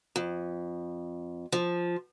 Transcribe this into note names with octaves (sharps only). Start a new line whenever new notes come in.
F2
F3